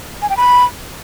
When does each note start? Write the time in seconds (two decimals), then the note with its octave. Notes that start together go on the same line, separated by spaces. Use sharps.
0.22 G#5
0.29 G5
0.37 B5